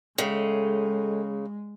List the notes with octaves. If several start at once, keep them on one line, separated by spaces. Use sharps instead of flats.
A2 C#3 G#3 D#4